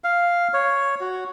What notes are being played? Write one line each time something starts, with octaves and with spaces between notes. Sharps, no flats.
F5
C#5
F#4